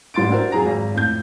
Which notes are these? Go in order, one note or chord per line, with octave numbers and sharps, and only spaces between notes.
A1 G3 C6 A6 D7
D4 E4 F#4 A#4 C5
F2 F#3 G#4 A#5 A#6
G#1
F2 A2 G6